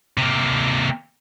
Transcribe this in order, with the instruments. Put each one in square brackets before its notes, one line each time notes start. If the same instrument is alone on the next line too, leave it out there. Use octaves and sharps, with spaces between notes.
[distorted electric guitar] C3 A#3